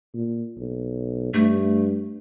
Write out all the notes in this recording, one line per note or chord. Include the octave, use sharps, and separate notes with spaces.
A#2
B1
G2 A3